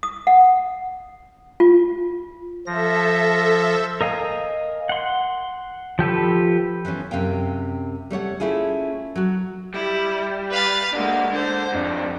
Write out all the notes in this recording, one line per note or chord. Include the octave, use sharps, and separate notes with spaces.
D#6
F#5
F4
F3 A4 E5 A#6
A#4 D#5 F5 G#5
F#5 C6
F3 G4 A4 B4
E3 F3 B3 C#4
F#2 C3 F5 G5
G3 A3 C#5 F#5
A3 C#4 E4 F4 G#4
F#3 F#4
G3 E4
B4 F5 A6
G#3 A#3 D4 F#4
D3 C5
F2 G#2 D4